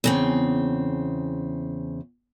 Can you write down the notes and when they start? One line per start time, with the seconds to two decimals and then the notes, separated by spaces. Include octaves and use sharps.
0.04 E2 C#3 C4